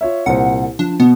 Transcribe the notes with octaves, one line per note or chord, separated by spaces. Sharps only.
F4 C#5 E5
C2 A#2 C5 F#5
F3 D4
B2 B3